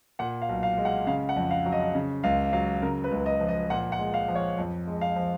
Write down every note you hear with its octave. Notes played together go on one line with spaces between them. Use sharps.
A#2 F#5
F5
B1
F5
G#3
F#5
C#3 F5
F#5
F2
F5
F#3
D#5
C#3
C#2 F5
F#3 F5
C#3 A#4
B4
C#2
D#5
F3
D#5
A#2 F#5
F#5
G#3
F5
F3
C#5
F2
G#3
F5
F3